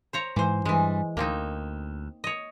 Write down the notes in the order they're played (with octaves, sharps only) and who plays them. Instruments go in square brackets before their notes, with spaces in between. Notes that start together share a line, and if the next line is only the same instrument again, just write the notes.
[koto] C5 C#5 A#5
[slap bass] G#2 [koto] E3 C5
[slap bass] G2 G3 [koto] E3 G#3
[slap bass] D2 [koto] A#3 C4 D#4
[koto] C#5 D#5